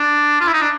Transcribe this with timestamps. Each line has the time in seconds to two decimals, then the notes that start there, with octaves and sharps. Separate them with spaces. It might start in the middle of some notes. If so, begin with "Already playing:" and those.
Already playing: D4
0.40 F4
0.47 E4
0.54 D#4
0.61 D4